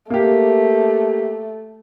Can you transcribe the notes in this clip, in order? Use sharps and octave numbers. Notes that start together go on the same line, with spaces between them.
A3 A#3 G4